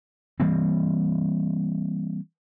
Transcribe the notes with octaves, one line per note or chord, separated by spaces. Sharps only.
E3 G3 A#3 C4